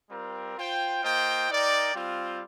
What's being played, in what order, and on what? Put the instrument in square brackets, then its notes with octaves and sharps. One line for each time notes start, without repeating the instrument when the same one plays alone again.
[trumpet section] G3 C4 F4 A#4
F4 C5 G5
A#3 F4 C5 D#5 G5
D#4 A#4 D5 G5
G3 C4 F4